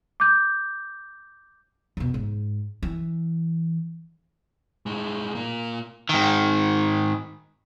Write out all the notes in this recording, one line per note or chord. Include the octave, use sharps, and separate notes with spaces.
D6 G6
E2 B2
G#2
E3
A2 G#3
A#2 A#3
G#2 D#3